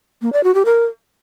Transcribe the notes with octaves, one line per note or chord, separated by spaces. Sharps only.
A#3
D5
F#4
G4
A#4